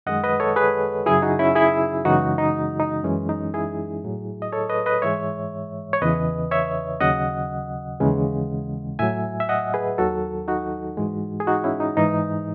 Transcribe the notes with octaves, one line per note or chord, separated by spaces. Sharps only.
F#2 D#3 G#3 D#5 F#5
B4 D#5
A4 C#5
G#4 B4
F#2 C#3 F#3 E4 G#4
D#4 F#4
C#4 E4
E4 G#4
F#2 C#3 E3 G#3 D#4 F#4
D#4
D#4
F#2 E3 G#3 C#4
D#4
E4 G#4
A2 F#3
D#5
A4 C#5
B4 D#5
B4 D#5
G#2 E3 G#3 C#5 E5
C#5
E2 C#3 E3 B4 D#5
C#5 E5
D#2 C#3 F#3 D#5 F#5
D#2 C#3 E3 G#3
A2 F#3 E5 G#5
E5
D#5 F#5
G#4 B4
D#2 D#3 F#3 F#4 A4
D#4 F#4
G#2 E3 G#3
G#4
D#4 F#4
C#4 E4
D#4
G#2 E3 G#3 D#4